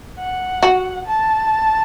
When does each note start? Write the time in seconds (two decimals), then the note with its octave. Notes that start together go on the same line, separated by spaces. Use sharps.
0.19 F#5
0.63 F#4
1.06 A5